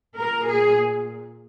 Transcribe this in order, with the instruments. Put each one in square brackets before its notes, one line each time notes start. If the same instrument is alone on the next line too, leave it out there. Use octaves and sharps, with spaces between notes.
[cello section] A#2 A#4
G#4